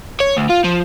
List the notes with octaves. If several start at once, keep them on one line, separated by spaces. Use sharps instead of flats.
C#5
D2
F4
F3